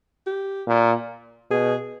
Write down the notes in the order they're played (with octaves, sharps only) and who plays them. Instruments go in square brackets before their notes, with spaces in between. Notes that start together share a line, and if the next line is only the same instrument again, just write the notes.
[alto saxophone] G4
[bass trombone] A#2
[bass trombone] B2 [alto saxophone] G#4